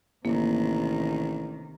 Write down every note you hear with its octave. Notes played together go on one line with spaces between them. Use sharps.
A1 C3 D#3 A#3